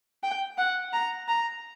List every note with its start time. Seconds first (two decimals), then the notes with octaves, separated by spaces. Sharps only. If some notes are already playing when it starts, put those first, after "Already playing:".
0.23 G5
0.58 F#5
0.93 A#5
1.28 A#5